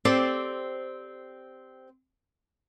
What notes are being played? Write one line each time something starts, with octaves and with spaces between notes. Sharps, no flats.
C4 G4 A4 C5 D5